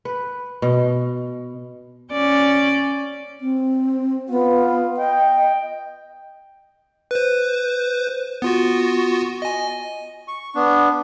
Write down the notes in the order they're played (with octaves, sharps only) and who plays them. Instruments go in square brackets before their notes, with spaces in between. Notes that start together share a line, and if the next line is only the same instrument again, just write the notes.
[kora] B4
B2
[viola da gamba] C#4 D5
[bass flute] C4
[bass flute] B3 [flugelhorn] F4
[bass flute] D#5 [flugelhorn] G5
[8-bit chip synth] B4 C5
B3 F4 F#4
D#5 G#5
[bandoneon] C#6
B3 D4